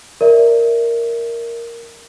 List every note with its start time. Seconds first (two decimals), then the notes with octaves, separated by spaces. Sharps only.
0.21 A#4 D5 E5